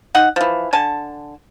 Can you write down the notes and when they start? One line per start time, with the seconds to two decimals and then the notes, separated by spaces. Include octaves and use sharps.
0.15 D#4 D#5 F#5
0.36 E3 F3
0.73 D3 G#5 A5